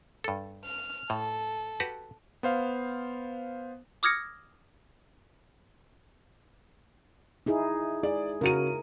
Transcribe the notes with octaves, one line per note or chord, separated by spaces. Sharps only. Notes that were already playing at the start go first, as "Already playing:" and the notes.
G2 A4
F6
A2 A4
F#4 G4 B4
B3 C5 F5
D6 D#6 F6 G#6 A#6 C#7
D#4 E4 G#4
G#4 D5
C#3 F#4 A#4 D#7